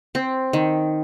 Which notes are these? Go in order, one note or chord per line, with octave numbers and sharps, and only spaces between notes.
C4
D#3